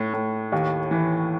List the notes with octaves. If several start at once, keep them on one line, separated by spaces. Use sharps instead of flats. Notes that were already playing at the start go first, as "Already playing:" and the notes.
Already playing: A2
A2
D#2
E3